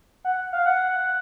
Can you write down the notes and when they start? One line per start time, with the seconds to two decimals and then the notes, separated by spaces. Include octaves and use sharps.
0.25 F#5
0.53 F5
0.66 F#5